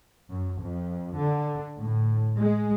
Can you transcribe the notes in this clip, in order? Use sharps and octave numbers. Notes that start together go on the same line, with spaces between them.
F#2
F2
D3
A2
G#3